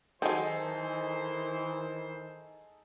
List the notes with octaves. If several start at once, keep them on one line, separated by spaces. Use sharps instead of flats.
D#3 E3 F#3 C4 D#4 G#4 A4 C5